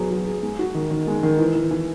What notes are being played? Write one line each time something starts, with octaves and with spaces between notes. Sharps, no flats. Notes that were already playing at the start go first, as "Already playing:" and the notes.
Already playing: F#3 B3 G#4
F#3
G#4
G#3
F#4
D#3
D#3
G#3
D#3
E3
E3
E3